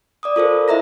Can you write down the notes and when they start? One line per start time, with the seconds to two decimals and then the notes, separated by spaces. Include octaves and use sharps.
0.23 D5 D6 D#6
0.36 F4 A4 A#4 C5
0.68 E4 D#5 E5 A#5 A#6